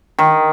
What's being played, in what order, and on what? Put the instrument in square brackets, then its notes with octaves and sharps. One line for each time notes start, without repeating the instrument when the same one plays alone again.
[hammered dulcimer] D#3